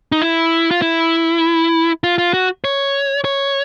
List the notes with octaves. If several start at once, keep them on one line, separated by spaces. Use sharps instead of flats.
D#4
E4
F4
E4
F4
F4
F#4
C#5
C#5